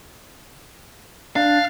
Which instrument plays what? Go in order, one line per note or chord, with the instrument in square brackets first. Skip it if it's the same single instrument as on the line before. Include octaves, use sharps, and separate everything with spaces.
[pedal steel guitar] D4 [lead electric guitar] F5